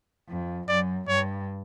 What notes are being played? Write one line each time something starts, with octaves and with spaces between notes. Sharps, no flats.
F2
F#2 D5
G2 C#5